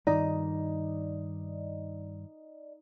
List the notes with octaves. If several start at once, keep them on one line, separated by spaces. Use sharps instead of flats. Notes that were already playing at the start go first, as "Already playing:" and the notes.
G2 D#3 D#4 D5 D#5